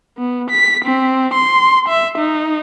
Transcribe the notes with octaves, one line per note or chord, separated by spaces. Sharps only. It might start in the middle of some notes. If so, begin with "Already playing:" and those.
B3
B6
C4
C6
E5
D#4